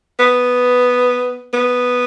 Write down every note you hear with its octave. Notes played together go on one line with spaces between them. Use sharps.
B3
B3